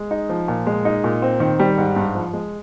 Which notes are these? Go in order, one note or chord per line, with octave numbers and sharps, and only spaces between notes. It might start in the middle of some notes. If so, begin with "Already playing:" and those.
Already playing: G#3
D#4
F3
A#2
G#3
D#4
A#2
C4
D#3
G3
G#2
G2
F3
G#3